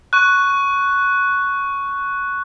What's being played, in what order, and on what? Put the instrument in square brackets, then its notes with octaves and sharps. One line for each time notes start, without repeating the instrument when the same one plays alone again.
[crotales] C#6 F#6